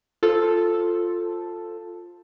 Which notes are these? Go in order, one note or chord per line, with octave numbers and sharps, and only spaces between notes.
F4 A4 C5